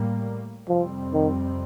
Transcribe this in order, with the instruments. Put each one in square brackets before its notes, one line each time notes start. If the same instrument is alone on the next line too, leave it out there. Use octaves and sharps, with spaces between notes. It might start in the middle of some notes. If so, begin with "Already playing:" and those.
Already playing: [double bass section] A2 G3 A#3
[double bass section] F2 C3 G3 C4 [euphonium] F3
[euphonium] D#3